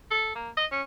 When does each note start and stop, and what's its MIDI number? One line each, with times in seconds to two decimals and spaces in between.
0.11 0.32 69
0.35 0.50 58
0.57 0.66 75
0.71 0.82 61